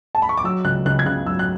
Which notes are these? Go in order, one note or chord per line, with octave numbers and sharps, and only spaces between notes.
A5
B5
C#6
D6
F#3 E6
C#2 F#6
C#2 F#6
G#6
C#3 F#6
F#3 E6
F#6